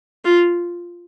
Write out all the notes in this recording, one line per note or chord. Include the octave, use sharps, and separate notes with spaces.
F4